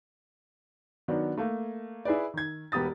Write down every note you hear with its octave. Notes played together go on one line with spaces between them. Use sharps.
D#3 F#3 B3 D4
A3 A#3
E4 G#4 B4 D5
D#3 G#6
E1 B3 G4 D#6 A6